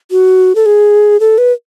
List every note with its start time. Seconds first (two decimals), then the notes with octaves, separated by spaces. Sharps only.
0.11 F#4
0.55 A4
0.66 G#4
1.20 A4
1.38 B4